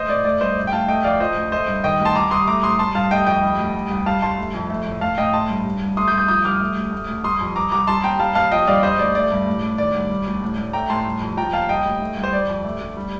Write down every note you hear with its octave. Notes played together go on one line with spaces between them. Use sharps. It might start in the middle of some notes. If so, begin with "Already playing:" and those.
Already playing: A3 C5 D#5
A2 D5
A3 D5
G2 C5 D#5
A3
G5
D2 F5 A5
A3 D#5 G5
F2 D5 F5
F3 C5 D#5
D2
A3 C5 D#5
G2
D#3 D#5 G5
D2
A5 C6
G3 A#5 D6
C2 C6 D#6
A3 A#5 D6
A2 C6 D#6
G3 A5 C6
G2 F5 A5
A3 D#5 G5
F2 D#5 G5
G3
D2
G3
C2
G3 F5 A5
G2 A5 C6
A3
F2
A3
A2
A2 F5 A5
A2 D#5 G5
A3 A5 C6
G2
G3
C2
A3 C6 D#6
D#6 G6
G2
D#6 G6
F3 D#6 G6
C2 D6 F6
A3
D2
A3
D2
G3 C6 D#6
F2
G3 A#5 D6
C2 A#5 D6
G3 A5 C6
D#2 G5 A#5
G3 F5 A5
D#2 F5 A5
F3 D#5 G5
G2 D5 F5
G3 C5 D#5
D2 D5
A3 D5
G2
A2
A2
D#3 D5
C2
G3
D2
A2
A2
A3 G5 A#5
A2 A5 C6
G3
F2
F3 G5 A#5
D#2 F5 A5
G3 D#5 G5
D2
A3
C2
C5
G3 D5
F2
A3
D2
G3